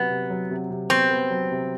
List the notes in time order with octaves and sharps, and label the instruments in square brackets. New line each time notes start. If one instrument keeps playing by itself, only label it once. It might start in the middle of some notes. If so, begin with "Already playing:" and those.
Already playing: [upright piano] C3 F#3 [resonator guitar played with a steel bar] B3
[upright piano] C3
F#3
C3
C3
[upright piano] B3 [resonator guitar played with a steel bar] C4
[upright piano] B3
F#3
C3